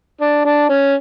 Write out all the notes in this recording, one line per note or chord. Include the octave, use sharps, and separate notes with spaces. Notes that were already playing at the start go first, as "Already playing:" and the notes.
D4
D4
C#4